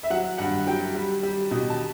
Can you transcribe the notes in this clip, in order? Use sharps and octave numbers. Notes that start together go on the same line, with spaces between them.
E5
F#3 F#5
G2 F#5
F#3 G5
G3
G3
B2
A5